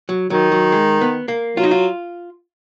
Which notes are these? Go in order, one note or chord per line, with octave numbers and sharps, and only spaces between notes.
F#3
D#3 F#3
F#3
G#3
B3
A#3
F#3 F4
D#4
F4